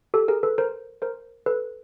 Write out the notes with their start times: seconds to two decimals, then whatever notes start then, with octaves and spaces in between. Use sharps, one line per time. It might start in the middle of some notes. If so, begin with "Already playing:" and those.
0.14 G4 A4
0.28 G#4 A#4
0.43 A4 B4
0.58 A#4 C5
1.02 A#4 C5
1.46 A4 B4